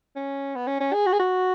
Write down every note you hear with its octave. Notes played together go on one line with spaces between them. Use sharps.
C#4
B3
C#4
C#4
G#4
F#4
G#4
F#4